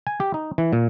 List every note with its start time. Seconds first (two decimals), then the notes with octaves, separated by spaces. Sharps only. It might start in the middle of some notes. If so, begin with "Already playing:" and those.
0.07 G#5
0.20 G4
0.34 D#4
0.58 E3
0.73 A#2